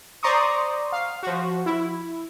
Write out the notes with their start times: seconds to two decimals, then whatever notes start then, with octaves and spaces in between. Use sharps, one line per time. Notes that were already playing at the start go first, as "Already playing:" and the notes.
0.23 C5 D5 A#5 C6 C#6 D#6
0.92 F5
1.23 F3 F#4
1.66 E4